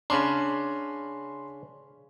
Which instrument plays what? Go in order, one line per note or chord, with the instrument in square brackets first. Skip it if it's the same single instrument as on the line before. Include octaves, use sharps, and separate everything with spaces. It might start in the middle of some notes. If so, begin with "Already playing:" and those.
[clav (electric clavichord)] C#3 C#4 D4 [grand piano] B5 C6